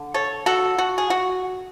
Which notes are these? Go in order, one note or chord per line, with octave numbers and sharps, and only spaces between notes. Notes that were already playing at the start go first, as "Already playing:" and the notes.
Already playing: D3
A4 C#5
F#4 A4
F#4
G#4
F#4